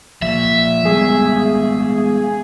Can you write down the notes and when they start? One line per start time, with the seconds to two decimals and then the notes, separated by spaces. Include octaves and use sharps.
0.22 F3 A#3 E5
0.85 G3 G#3 B3 G#4